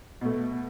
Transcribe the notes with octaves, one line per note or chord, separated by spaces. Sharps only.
B2 A3